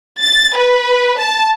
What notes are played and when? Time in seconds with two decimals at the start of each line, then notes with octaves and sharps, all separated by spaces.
0.20 A6
0.56 B4
1.19 A5